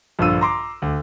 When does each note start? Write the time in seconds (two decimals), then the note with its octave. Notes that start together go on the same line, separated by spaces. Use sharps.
0.19 A#1 G2 D3 F4 E6 D#7
0.41 A#5 C6 D6
0.82 D2